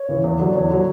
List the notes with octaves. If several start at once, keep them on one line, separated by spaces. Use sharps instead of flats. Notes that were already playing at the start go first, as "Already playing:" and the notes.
Already playing: C#5
C#3 E3
E2
D3 F#3
D5
E2 C#5
D3 F#3